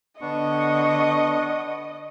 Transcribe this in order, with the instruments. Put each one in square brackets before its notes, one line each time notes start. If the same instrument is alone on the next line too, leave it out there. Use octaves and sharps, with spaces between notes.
[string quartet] D3 C#6 [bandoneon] B3 D4 [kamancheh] D#5